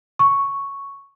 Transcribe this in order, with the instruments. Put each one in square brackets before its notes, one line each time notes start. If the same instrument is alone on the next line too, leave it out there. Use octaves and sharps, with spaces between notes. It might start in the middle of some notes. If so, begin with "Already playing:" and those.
[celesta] C#6